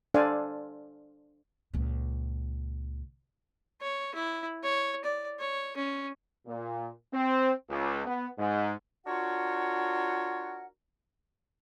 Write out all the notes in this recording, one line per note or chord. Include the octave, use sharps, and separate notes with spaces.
D4 A4 C5 D5 F5 G#5
C#2 A#2
C#5
E4
C#5
D5
C#5
C#4
A#2
C4
C#2
B3
G#2
D4 F4 F#4 A#4 C#5 F#5